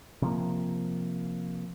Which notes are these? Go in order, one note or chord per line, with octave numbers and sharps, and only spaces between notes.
C3 F3 A#3